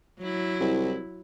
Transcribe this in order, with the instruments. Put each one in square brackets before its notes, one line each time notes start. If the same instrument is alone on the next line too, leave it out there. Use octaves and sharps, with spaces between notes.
[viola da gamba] F#3 E4
[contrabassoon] C2